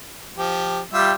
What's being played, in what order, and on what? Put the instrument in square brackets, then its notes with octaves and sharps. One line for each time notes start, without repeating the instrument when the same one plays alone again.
[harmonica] F3 G4
[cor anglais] G3 [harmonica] F4 G4 E5